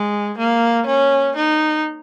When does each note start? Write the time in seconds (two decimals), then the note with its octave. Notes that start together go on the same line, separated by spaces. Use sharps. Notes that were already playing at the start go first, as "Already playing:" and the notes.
Already playing: G#3
0.38 A#3
0.87 C#4
1.36 D#4